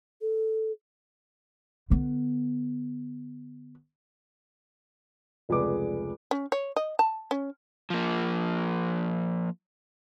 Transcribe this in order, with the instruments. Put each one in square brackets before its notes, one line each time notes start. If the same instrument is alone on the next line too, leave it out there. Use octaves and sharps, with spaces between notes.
[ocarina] A4
[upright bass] D3 B3
[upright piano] F1 C#2 G#4 B4 D5 D6
[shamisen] C#4
C#5
D#5
A5
C#4
[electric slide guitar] F3 A#3